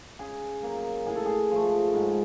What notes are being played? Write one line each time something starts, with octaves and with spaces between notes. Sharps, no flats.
C#3 G#4
F#3 A#3
A2 G#4
A4
G#4
F3 A3
G#2